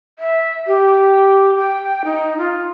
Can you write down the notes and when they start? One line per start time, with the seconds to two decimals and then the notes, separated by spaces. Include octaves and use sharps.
0.19 E5
0.67 G4
1.58 G5
2.05 D#4
2.38 F4